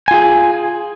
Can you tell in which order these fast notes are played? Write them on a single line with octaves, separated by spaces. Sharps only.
G#5 F4 G#4